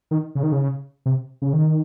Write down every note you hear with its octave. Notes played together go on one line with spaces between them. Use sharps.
D#3
C#3
D#3
C#3
C3
C#3
D#3